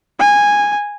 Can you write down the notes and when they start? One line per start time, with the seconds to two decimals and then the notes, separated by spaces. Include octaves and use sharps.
0.19 G#5